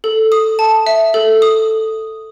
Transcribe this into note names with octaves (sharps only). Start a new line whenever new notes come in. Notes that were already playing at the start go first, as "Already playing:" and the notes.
A4
D#6
A5
E5
A4
D#6